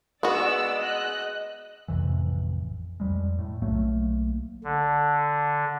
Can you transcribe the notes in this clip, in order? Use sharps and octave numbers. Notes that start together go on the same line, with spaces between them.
G#3 B3 F#4 D5 F#5 E6
D#5 F#6
A1 F2 C3 E3
F2 G3 G#3
A2
B1 F#3 A3 A#3
D3